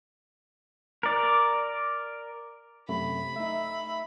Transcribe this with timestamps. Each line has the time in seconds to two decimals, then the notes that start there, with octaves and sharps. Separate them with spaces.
1.03 A#4 D5
2.89 F#2 C3 A3 B5
3.36 A3 D#4 E5